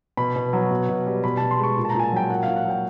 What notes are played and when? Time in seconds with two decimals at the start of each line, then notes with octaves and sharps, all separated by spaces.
0.17 B2 B5
0.36 B2
0.53 F#3
0.71 B2
0.89 B2
1.06 G3
1.24 B2 B5
1.37 B2 A5
1.51 C6
1.59 G#3 C#6
1.77 A#2
1.85 A5
1.90 A#5
1.95 A#2 G#5
2.04 A5
2.12 F#3 G5
2.30 A#2 F#5
2.43 F5
2.48 A#2
2.56 F#5
2.65 F#3 G5